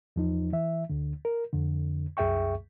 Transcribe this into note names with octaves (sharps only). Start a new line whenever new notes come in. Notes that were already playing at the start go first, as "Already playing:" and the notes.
E2 F3 D#4
E3 E5
D2 D3
A#4
F2 D3
C2 F#2 G#4 E5 G5 C#6